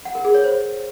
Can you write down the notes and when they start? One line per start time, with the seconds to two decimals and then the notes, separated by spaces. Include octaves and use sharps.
0.05 F#5
0.15 A#4
0.25 G#4
0.34 C#5
0.44 C5